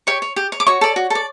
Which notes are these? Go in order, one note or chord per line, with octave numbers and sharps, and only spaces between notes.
G4 C#5 C#6
C#5
G4
C#5
D6
F#4 C#5 C#6
A4 D5
F#4
A4 D5